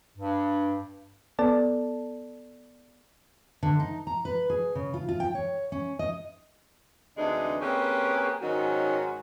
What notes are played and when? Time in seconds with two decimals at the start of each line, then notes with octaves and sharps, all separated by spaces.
0.17 G2
1.39 B3 A4 D5 A5
3.63 D3
3.80 D#4
4.07 A#5
4.25 B4
4.50 G#4
4.75 C#3
4.94 F4
5.09 F4
5.20 G5
5.35 C#5
5.72 C#4
5.99 D#5
7.16 D2 C3 E3 G#3 D4 D#4
7.60 A#3 C4 C#4 G4 G#4 B4
8.42 G#2 D#3 F#3 C#4 D#4 F#4